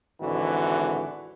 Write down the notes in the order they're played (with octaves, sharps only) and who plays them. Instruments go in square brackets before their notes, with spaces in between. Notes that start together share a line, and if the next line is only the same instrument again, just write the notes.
[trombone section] G#1 C#2 D3 E3 F#4